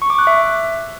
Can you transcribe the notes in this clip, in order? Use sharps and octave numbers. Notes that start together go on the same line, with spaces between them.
C#6
D6
F#6
E5